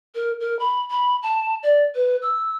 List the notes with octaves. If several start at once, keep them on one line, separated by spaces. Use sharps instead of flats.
A#4
A#4
B5
B5
A5
D5
B4
E6